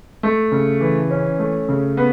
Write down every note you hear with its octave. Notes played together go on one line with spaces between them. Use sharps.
A3
C#3
E3
C#4
A3
C#3
B3